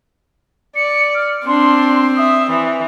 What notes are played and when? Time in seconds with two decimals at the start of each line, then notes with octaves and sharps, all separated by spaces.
0.76 D5 C#7
1.15 F6
1.47 C4 D4 C6
2.17 E5 D#6
2.50 E3